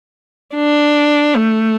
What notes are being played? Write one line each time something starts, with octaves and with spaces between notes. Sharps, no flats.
D4
A3